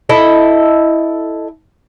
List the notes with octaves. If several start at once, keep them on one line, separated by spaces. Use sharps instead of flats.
E4 A4 D#5